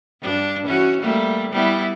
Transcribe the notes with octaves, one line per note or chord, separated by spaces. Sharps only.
G2 D4
E3 C#4 F#4
G3 A3 A#3
G3 B3 E4